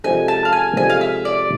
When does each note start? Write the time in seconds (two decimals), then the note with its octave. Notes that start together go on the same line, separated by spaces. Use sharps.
0.04 C3 F3 G#3 D4 A4 G#5
0.28 A5
0.45 F5
0.53 G#5
0.77 C3 F3 G#3 D4 A4 G#5
0.90 F5
1.01 E5
1.25 D5